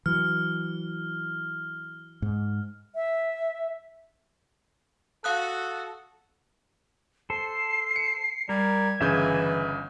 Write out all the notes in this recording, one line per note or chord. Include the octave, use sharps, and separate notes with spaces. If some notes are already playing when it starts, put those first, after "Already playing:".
E3 F#3 F6
G#2
E5
F#4 A4 F5 D#6 F#6
A4 C5 C7
C#7
G3 A#4 G#6
G1 C#3 E3 E5 G#5 G6